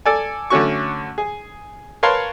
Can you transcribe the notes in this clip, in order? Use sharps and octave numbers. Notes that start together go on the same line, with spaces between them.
A4 D5 G#5
D3 A3 C#4 F#4 C#6
G#4
A#4 B4 C#5 F5 A5 C6